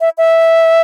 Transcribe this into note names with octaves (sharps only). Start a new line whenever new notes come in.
E5
E5